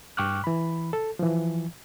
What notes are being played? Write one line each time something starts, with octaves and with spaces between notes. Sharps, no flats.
G2 G5 C#6 D6 F6 F#6
E3 B5
A4
E3 F3